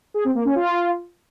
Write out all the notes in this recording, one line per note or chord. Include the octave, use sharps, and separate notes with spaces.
G#4
C4
A#3
C#4
F4